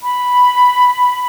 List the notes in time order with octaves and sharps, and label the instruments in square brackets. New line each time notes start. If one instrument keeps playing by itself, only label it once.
[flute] B5